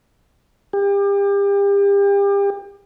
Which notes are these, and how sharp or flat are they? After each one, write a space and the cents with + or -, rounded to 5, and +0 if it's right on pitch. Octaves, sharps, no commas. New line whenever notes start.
G4 +35